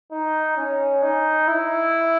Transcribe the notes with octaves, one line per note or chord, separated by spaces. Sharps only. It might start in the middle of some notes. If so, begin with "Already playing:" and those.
D#4
C#4
D#4
E4